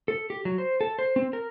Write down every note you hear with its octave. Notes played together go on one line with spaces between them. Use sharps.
A4
G4
F#3
C5
A4
C5
C4
A#4